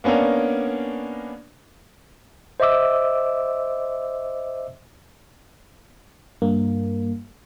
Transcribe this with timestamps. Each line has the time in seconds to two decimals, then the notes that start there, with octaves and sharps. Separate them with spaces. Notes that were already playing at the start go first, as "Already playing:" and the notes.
0.04 A#3 B3 C#4 D4 A#4
2.60 C5 D#5 E5 D6 E6
6.42 G2 A#3